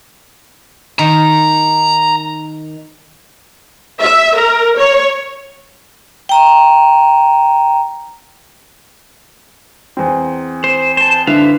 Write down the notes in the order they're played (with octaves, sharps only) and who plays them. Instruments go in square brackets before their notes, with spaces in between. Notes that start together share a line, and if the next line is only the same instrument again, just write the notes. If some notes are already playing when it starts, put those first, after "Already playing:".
[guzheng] D#3 [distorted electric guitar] A#5
[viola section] E5
A#4
C#5
[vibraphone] G5 A#5
[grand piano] E2 C4
[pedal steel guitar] C5
C5 A5
[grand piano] D3 E4 [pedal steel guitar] B4 C5 F5